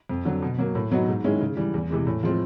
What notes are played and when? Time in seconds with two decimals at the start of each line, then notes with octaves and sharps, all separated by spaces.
0.09 F2
0.25 D3 F#3
0.42 B2
0.59 F#3 A#3
0.75 A2
0.91 F#3 B3 D#4 F#4
1.08 G#2
1.24 D#3 G#3 C#4 E4
1.41 C#3
1.57 E3 G3
1.74 E2
1.90 C3 E3 G#3
2.07 A2
2.23 F3 G#3 C4 F4